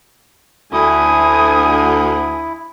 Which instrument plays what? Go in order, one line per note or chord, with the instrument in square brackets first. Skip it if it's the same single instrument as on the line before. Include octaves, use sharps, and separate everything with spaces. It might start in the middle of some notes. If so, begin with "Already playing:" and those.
[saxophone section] D2 [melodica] E4 [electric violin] G#5 D#6